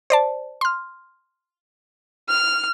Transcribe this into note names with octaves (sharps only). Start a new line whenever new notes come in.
C5 D5 A5
C6 F6
F6